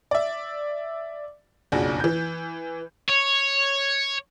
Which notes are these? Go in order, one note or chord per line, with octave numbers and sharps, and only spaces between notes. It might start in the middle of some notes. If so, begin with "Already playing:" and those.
D5 E5
F#1 B1 F2 D4 F#4 G#4
E3 G6
C#5